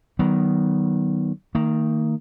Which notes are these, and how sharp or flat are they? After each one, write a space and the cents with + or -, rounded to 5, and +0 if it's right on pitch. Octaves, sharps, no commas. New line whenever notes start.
D#3 +0 F#3 +40 B3 +0
D#3 +0 A#3 -45